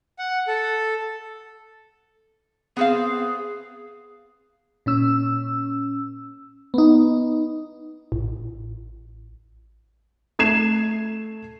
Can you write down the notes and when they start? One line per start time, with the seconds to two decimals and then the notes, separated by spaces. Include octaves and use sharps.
0.19 F#5
0.48 A4
2.77 B3 C4 G#4 F5
4.86 A#2 C#4 E6
6.74 B3 D#4
8.12 A1
10.39 A3 G#6 C7 E7